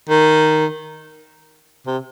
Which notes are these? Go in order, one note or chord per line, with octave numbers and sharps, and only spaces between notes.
D#3
C3